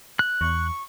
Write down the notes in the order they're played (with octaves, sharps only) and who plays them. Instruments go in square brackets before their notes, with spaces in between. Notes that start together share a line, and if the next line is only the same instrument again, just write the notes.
[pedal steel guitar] F#6
[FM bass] E2 [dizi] C#6